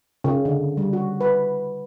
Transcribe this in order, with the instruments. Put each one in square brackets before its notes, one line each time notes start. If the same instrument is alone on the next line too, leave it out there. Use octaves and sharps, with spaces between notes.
[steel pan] C#3
D3
G3
F#4
B4